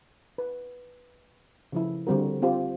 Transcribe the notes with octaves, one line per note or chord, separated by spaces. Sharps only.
B4
C#3 F3 E4
D3 G3 C4 F#4 A#4
C4 F4 G4 C5